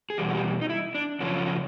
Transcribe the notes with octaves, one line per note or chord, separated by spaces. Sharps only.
G#4
E2 B2 G3 G4
F#4
G4
D#4
E4
D4
F#2 C#3 F3 C#4